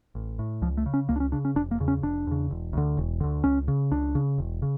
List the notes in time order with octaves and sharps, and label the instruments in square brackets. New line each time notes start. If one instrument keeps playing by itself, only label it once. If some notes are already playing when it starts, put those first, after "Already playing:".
[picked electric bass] A1
A2
C#2 F3
A3
C#3
C#4
C#2 A#3
D4
C#4
C#3 D4
C#4
F1 D4
A#3
E2 C#3
C#4
F1 D4
E2 C#3
E1
D2 D3
E1
D2 D3
C#2 C#4
C#3
C#2 D4
C#3
E1
C#3